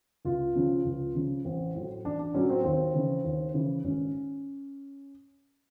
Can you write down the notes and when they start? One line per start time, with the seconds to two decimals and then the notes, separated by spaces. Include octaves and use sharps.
0.25 C#2 F4
0.55 C#3 F3
0.85 C#2
1.15 C#3 F3
1.45 A1 C4
1.75 A2 F#3
2.05 A1 D4
2.19 D4
2.34 A2 F#3 C#4
2.50 C4
2.64 D#2 C4
2.94 C#3 E3
3.24 D#2
3.54 C#3 E3
3.84 G#1 C#4